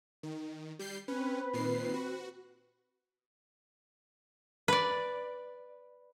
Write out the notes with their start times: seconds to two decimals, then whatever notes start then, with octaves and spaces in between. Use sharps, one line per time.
0.23 D#3
0.79 G3 G6 C7
1.08 C4 C#4 B4
1.53 A#2 D#3 C7
1.94 F#4
4.68 B4 D5